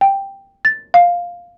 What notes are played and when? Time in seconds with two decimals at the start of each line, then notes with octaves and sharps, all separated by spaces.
0.01 G5
0.65 A6
0.94 F5